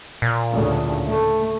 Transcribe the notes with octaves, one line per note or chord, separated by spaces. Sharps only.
A#2
D2 A2 C#3
A3